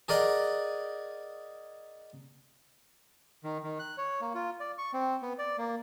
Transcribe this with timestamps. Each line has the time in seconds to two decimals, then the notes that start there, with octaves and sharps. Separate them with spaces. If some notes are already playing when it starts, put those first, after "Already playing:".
0.08 G#4 A#4 D5 D#5 F#5
3.44 D#3
3.64 D#3
3.79 F#6
3.98 C#5
4.21 A#3
4.35 F4
4.60 D5
4.78 C#6
4.93 C4
5.22 B3
5.39 D5
5.58 A#3